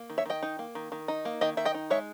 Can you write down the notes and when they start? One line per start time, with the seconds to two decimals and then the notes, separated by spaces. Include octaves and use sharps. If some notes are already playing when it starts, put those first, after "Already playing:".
Already playing: A#3
0.10 D#3
0.18 C#5 E5
0.26 D#3 D#5 G5
0.43 D#4
0.59 A#3
0.75 D#3
0.92 D#3
1.08 D#4
1.25 A#3
1.41 D#3 D#5 G5
1.57 D#3 E5
1.65 D#5 G5
1.74 D#4
1.90 G#3 C#5 E5